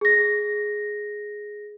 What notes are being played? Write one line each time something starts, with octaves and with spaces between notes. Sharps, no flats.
G#4 A#6